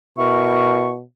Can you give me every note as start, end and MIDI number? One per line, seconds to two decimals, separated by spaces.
0.18 1.02 47
0.18 0.92 64
0.18 0.92 70
0.18 0.92 85